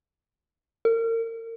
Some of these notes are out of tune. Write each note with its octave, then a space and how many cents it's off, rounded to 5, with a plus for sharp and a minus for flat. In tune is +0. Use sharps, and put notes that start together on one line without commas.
A#4 -35